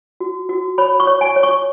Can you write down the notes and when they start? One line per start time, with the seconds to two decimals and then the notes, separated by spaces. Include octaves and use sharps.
0.20 F#4
0.49 F#4
0.78 C#5 B5
1.00 C#6
1.07 C#5
1.21 G#5
1.36 C#5
1.43 C#6